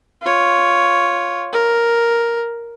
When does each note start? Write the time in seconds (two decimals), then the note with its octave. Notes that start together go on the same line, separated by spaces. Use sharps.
0.22 F4 C#5
1.53 A#4